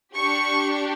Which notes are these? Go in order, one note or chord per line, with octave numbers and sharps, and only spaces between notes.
D4 G4 C#6